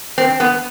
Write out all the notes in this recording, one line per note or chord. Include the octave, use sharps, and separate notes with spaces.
C4
B3